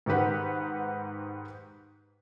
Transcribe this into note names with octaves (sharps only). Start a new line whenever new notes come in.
G#2 D#3 G4 B4 F#5